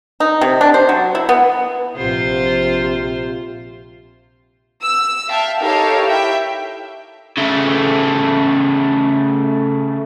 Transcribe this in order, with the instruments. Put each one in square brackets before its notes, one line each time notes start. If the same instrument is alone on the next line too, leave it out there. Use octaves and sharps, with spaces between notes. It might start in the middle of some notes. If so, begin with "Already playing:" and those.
[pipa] D#4
C3
D4
C5
F#3
E4
B3
[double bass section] A#1 [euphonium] C3 [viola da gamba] F4 C5
[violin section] E6
E5 F5 G5 A5
D#4 G4 A4 A#4 C#5 F5
E4 E5 G5
[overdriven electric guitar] C#3 A3